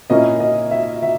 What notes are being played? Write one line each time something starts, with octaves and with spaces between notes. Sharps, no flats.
A#2 A#3 C#4 E4 D#5
D#5
E5
E5